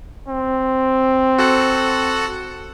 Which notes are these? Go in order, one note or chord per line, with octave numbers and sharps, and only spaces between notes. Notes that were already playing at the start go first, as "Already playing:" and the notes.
C4
F#4 A4 F#5